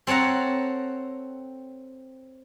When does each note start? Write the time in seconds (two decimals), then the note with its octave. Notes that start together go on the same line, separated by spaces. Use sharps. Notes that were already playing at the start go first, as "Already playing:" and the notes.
0.07 C4 A4 C#5 F#5 A#5